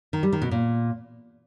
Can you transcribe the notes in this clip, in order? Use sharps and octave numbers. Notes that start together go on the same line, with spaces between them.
D#3
G3
D#3
B2
A#2